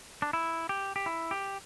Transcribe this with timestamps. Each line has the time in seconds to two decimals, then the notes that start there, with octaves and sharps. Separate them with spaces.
0.22 D4
0.33 E4
0.69 G4
0.96 G4
1.06 E4
1.31 G4